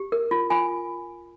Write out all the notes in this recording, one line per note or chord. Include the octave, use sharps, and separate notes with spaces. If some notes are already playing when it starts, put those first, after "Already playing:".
Already playing: G4
A#4
F4
F4 G#5